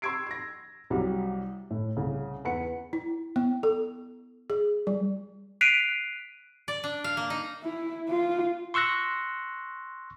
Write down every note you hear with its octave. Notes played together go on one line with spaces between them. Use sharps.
C6 C#6 E6 G#6 C7 D7
G#6 A#6
C2 F#3 G3
A2
C2 C#3
E2 B4 F#5 C#7
E4
B3
A4
G#4
G3
F#6 B6 C7 D7 D#7 F7
D5
D4
F5
A#3
D#4
E4
F4
C6 C#6 E6 F#6 A#6